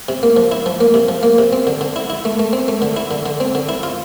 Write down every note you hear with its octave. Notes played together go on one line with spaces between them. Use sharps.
C3
A#3
F3
E4
F3
A#3
C3
F3
A#3
C3
C4
D3
D3
E4
E4
A3
A3
C4
A3
D3
E4
D3
D3
C4
D3
E4
F4